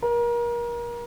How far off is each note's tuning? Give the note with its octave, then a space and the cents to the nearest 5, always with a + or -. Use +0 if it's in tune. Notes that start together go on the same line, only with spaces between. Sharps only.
A#4 +30